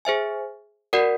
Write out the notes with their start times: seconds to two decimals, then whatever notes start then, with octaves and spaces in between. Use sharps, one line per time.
0.05 G#4 C5 E5 G#5
0.93 F#4 A#4 D5 F#5